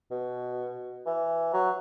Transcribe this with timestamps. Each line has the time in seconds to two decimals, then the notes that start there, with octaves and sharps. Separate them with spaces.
0.11 B2
1.06 E3
1.53 F#3